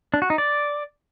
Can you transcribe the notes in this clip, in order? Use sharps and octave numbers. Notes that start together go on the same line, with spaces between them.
D4
F#4
D#4
D5